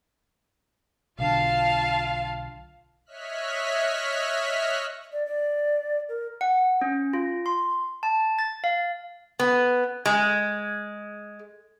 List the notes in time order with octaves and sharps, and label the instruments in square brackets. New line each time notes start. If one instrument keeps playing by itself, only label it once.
[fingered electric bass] B1 D3 [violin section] F4 F5 A5
[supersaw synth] C#5 D#5 E5 F6 F#6 B6
[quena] D5
D5
A#4
[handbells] F#5
C#4
F4
C6
A5
A6
F5
[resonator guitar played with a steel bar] B3
G#3